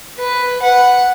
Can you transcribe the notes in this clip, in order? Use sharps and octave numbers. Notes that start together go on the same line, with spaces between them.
B4
F#5